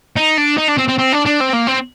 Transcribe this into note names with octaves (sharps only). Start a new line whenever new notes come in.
D#4
D4
D#4
D4
C4
C4
C4
D4
D4
C4
A#3
C4